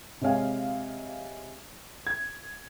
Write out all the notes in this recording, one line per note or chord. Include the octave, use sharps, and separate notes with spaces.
C3 G#3 C#5 F5 G#5
G#6